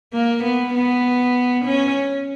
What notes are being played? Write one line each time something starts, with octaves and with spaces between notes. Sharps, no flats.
A#3
B3
B3
C#4